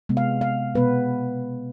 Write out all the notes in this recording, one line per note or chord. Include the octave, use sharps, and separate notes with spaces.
C3 G#3 B3
F5
F5
B2 G#3 B3 B4